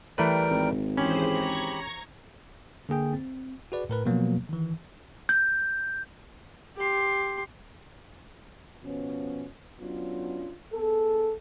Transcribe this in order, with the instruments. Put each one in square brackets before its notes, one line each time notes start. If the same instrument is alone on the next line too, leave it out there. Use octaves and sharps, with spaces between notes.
[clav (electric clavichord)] E3 A3 B4 [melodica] G3 A#4 G5
[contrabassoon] G#1
[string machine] E3 G#4 C5 [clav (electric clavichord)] C#4 [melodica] G4 B5
[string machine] A#5 C#6 G#6
[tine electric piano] D3 A#3 G#4 G5
C4
F#4 G#4 B4 D5
A2 A#4 B4
B2 F3 F#3 A#3 B3
D#3 E3
[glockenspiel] G6
[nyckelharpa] G4 C6
[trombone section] B2 F3 B3 C#4
F#3 B3 C#4 D4 F4
B3 G#4 A4